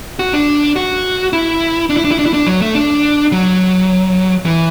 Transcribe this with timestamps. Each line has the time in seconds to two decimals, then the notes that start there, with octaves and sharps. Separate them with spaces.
0.19 F#4
0.33 D4
0.76 F#4
1.33 E4
1.90 D4
1.97 E4
2.04 D4
2.11 E4
2.19 D4
2.26 E4
2.33 D4
2.47 F#3
2.61 A3
2.75 D4
3.32 F#3
4.45 E3